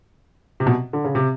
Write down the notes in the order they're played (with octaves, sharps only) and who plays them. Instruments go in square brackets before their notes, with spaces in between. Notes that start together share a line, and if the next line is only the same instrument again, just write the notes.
[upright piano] C3
B2
D3
C#3
C3